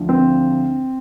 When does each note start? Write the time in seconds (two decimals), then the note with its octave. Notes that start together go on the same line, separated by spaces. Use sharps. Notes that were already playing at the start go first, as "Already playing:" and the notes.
Already playing: D2 D3 F3
0.09 C4